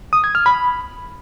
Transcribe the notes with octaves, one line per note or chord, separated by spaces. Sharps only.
D#6
G#6
F6
B5